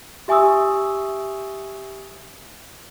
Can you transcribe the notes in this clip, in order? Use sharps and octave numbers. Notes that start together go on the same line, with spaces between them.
G4 E5 G#5 C#6 D#6 E6